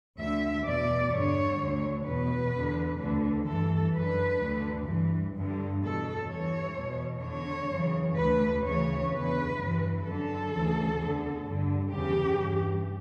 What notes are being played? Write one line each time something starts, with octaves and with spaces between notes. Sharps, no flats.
D2 D3 E5
E2 B2 D5
G2 D3 C#5
D2 D3
E2 B2 B4
E2 D3
D2 D3
G2 E3 A4
F#2 D3 B4
D2 D3
G2 E3
G2 D3
E2 B2 A4
G2 E3 C#5
E2 B2
E2 D3 C#5
F#2 C#3 E3
D2 D3 B4
D2 C#3 E3 C#5
E2 D3 B4
G2 E3
F#2 D3 A4
D2 C#3 E3
E2 D3
G2 D3
E2 C#3 E3 G4
G2 E3